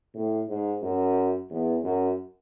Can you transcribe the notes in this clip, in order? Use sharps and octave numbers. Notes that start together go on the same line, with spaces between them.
A2
G#2
F#2
E2
F#2